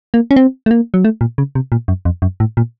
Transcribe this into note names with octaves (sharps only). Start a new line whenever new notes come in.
A#3
C#4
C4
A3
A#3
F#3
A3
A#2
C#3
C3
A#2
F#2
F2
F#2
A2
A#2